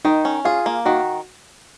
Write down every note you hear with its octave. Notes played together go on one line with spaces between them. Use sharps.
D#3 D#4
C#4
F4 G#4
A#3
D#3 F#4